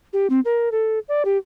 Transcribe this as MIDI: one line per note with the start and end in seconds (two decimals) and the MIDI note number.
0.13 0.27 67
0.30 0.40 60
0.45 0.69 70
0.72 0.99 69
1.08 1.23 74
1.25 1.37 67